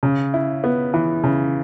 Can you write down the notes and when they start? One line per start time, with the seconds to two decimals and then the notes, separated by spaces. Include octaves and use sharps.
0.03 C#3
0.34 E4
0.64 B3
0.94 E3
1.24 C#3